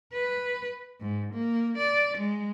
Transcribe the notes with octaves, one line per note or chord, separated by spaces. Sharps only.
B4
G#2
A#3
D5
G#3